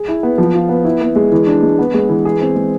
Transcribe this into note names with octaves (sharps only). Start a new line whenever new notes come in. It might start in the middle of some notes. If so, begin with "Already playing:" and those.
Already playing: G#4
E4
B3
F3
F4
B3
E4
B3
G#3
E3
D4
G#3
B3
G#3
E3
G#4
C4
G#3